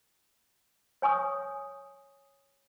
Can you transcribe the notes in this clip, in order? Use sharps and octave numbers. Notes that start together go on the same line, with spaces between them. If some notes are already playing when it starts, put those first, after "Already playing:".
C#5 G#5 C#6 D#6